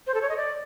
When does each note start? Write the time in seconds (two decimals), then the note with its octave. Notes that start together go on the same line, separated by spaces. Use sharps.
0.07 C5
0.14 A4
0.22 C#5
0.29 D#5
0.37 D5